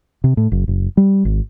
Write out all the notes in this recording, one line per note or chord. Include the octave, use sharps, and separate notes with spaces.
C3
A2
F#1
F#1
G3
G#1